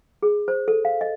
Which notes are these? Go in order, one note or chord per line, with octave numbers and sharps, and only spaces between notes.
G#4
C5
A4
F5
D#5